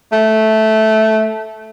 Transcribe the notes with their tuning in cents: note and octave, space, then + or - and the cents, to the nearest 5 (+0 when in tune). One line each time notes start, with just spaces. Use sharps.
A3 -10